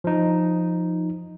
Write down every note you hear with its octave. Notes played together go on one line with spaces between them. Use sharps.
F3 D#4